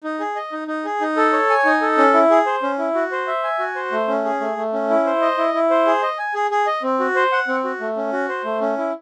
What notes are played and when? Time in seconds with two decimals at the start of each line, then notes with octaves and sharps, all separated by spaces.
0.04 D#4
0.20 G#4
0.36 D#5
0.52 D#4
0.68 D#4
0.85 G#4
1.01 D#4
1.17 A4
1.33 C#5
1.50 G#5
1.65 D#4
1.82 A4
1.98 C#4
2.14 E4
2.31 G#4
2.46 C5
2.63 C#4
2.78 E4
2.95 F#4
3.12 C5
3.27 E5
3.44 G#5
3.59 F#4
3.76 C5
3.92 A3
4.08 C#4
4.25 G#4
4.41 A3
4.57 A3
4.73 C#4
4.90 E4
5.06 C5
5.21 D#5
5.38 E4
5.54 E4
5.70 C5
5.86 G#4
6.03 D#5
6.19 G#5
6.34 G#4
6.51 G#4
6.67 D#5
6.83 C4
7.00 F#4
7.15 C5
7.32 F#5
7.48 C4
7.64 F#4
7.81 A3
7.96 C#4
8.13 F#4
8.29 C5
8.44 A3
8.61 C#4
8.78 E4